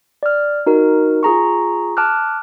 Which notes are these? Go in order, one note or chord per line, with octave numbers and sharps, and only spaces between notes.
D5 F6
D#4 F#4 A#4
F4 G#4 A#5 C#6
A5 D6 F6 F#6